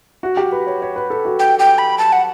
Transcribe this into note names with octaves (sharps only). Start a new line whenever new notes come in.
F#4
G4
B4
C#5
C#5
B4
A4
F#4
G5
G5
B5
A5
F#5